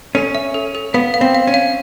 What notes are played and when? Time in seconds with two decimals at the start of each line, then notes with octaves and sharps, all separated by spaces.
0.15 C#4 A4
0.35 E5
0.54 A4
0.75 A4
0.94 B3 F5
1.14 F5
1.21 C4
1.35 F5
1.47 C#4
1.54 F5